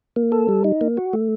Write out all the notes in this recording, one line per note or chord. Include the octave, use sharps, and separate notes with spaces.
A#3
A4
G3
D#4
A#3
F#4
A3